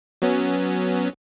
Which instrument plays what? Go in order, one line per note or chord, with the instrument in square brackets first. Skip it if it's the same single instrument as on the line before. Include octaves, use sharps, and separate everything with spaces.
[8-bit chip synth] F#3 B3 C#4